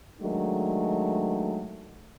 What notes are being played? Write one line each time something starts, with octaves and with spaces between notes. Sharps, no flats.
D#3 F#3 G#3 A3 D4